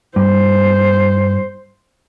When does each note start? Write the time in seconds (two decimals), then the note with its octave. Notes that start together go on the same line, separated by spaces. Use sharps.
0.16 G2 C5